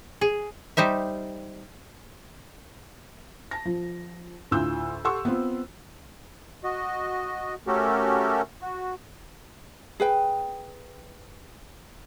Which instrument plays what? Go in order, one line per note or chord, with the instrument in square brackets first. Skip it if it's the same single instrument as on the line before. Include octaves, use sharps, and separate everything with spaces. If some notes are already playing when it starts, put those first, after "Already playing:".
[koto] G#4
G3 D#4 C5 E5
[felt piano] A5 A#6
F3
D2 A2 F4 E6 G6
G4 A4 F#5 C6 C#6 E6
B3 C4 F4
[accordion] F#4 D#5
A3 C#4 F#4 G4 A4 A#4
F#4
[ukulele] G#4 B4 G5